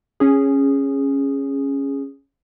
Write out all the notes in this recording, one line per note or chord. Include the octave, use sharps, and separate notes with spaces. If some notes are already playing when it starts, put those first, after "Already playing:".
C#4 G#4